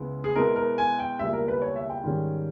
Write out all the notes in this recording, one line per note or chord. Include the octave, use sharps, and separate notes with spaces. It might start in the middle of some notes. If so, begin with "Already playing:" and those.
Already playing: C#2 C#3 G#3 B3 E4
G#4
B2 G#3 B3 E4 A#4
A#4
G#5
G5
C#2 B2 G3 A#3 E4 E5
A#4
B4
C#5
E5
G5
G#2 D#3 G3 C#4